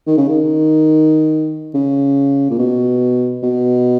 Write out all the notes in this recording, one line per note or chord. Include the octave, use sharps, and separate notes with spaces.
D#3
C#3
D#3
C#3
A#2
B2
B2